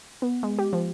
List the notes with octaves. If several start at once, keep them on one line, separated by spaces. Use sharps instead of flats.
B3
G#3
G4
F3